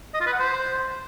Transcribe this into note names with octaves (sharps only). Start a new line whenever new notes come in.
D#5
F4
B4
F#5
C5